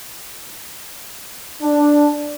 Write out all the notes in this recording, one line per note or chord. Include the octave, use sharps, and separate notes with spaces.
D4